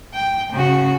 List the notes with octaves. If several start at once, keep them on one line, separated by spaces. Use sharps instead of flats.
G5
C#3 F#4